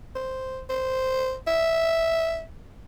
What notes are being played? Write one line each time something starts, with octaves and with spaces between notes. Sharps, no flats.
C5
C5
E5